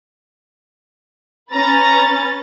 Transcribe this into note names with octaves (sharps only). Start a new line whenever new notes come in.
C#4 B4 A#5 A6